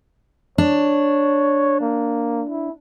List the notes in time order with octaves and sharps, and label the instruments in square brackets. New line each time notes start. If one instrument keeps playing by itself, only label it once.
[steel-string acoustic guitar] D4 [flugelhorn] C#5
[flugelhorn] A#3
E4